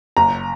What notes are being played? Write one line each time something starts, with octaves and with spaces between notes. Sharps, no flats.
F#1 A#5